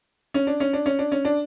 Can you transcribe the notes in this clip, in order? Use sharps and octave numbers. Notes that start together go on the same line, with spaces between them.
C#4
D4
C#4
D4
C#4
D4
C#4
D4